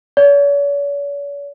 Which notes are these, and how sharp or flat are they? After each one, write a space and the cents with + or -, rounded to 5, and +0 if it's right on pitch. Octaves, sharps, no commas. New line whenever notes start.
C#5 +45